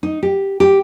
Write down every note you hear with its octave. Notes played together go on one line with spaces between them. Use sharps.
D#4
G4
G4